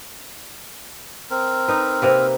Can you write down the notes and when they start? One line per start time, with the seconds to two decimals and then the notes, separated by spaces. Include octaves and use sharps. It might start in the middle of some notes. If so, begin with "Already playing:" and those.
1.30 C4 A#4
1.68 D#4 B4
2.02 C3 A#3 B4